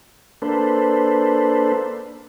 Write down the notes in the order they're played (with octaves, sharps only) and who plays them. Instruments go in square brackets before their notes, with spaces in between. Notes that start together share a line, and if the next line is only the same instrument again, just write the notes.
[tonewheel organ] A#3 D4 A4 B4 C5